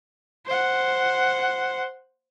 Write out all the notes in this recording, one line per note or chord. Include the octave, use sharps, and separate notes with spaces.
C5 F#5